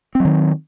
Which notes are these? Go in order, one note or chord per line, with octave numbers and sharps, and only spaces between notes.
D#3 F#3 C4